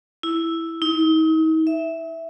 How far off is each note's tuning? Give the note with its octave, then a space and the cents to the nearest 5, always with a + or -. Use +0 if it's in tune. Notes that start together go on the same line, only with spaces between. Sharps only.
E4 -5
D#4 +40
E5 -5